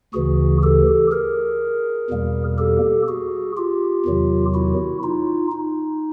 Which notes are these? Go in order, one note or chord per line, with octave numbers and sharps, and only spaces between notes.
D2 C#3 E3 F#4 G#4
G4 A4
G#4 A#4
E2 B2 G3 A#3
G4 A4
F#4 G#4
F4 G4
E2 C3 D#3 F#3
E4 F#4
D#4 F4
D#4